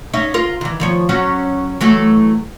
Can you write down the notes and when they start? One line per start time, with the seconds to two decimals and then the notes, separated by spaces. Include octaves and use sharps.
0.13 C#4 D#4 E5
0.34 F4 A#4
0.61 D#3 E3
0.80 D#3 F3 C#5
1.09 F#3 C#4 F#4
1.81 E3 F#3 A3